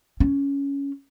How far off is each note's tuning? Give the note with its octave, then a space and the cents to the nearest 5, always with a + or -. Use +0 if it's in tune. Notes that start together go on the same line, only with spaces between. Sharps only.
C#4 +10